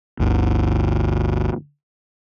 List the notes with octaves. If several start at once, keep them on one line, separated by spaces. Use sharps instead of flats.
G1 D2